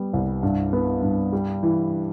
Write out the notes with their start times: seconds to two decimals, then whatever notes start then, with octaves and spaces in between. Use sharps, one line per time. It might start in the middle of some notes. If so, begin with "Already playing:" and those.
Already playing: G3 B3
0.13 C2
0.43 G2
0.73 B3
1.02 G2
1.33 G3
1.63 E3